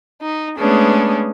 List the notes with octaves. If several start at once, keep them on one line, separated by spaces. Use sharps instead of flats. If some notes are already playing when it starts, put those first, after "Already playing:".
D#4
G#3 A3 B3 C#4 D4 G#4